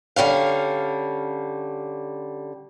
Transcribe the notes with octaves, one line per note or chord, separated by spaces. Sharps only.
D3 G3 C#4 F5